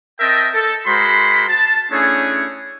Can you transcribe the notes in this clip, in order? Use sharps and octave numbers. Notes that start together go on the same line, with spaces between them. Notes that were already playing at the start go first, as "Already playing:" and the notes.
C4 A#4 D#5 E5 G5 A5
A4
G#3 F#4 A#4 C5 B5 C6
A5
A3 C#4 D4 E4 G#4 C#5